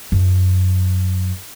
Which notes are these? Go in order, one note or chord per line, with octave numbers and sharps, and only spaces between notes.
F#2